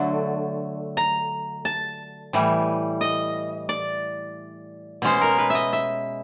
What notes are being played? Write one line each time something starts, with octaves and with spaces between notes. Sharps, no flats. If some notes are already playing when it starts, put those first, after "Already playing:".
Already playing: D3 F#3 A3
A#5
A5
A2 E3 G3
D#5
D5
B2 G#3 C#4 C5
A#4
B4
D#5 E5
E5